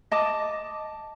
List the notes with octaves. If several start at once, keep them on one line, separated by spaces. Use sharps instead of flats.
D#5 A5 D6 D#6